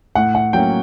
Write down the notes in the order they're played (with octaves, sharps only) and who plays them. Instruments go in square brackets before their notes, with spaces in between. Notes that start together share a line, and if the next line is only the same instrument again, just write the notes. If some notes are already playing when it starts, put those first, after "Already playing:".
[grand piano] A2 F#5
F#5
F#3 A#3 C#4 G5